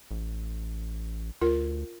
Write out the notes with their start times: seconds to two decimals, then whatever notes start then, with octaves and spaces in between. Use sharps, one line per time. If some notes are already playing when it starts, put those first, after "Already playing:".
0.11 A1
1.41 D2 F4 A#4